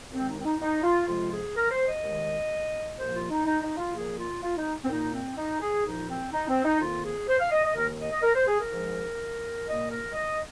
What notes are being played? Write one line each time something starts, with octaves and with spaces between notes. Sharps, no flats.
D#2 D#3 G#3 C4
D#4
C4
D#4
D#4
F4
F2 C3 F3 G#3 F4
G#4
A#4
C5
D#5
D#2 D#3 G#3
C2 A#2 F3 A#3 C5
F4
D#4
D#4
D#4
F4
A#2 F3 A#3 G#4
F4
F4
D#4
C4
A#2 A#3 D#4
C4
D#4
G#4
C2 A#2 F3 D#4
C4
D#4
C4
D#4
F2 D#3 A#3 F4
G#4
C5
F5
D#5
D#5
D#2 D#3 A#3 A#4
D#5
D#5
A#4
C5
G#4
A#4
G#2 F3 G#3
A#2 A#3 D#5
A#4
D#5